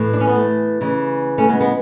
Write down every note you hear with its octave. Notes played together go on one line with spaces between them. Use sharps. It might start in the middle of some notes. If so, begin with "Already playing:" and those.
Already playing: A2 E3
D4
C#4
B3
A3
C#3 E3
A3 C#4
G#3 B3
G#3 B3